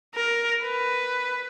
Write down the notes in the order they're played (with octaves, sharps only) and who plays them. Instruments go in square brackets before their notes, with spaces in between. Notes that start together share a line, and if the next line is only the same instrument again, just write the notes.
[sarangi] A#4
B4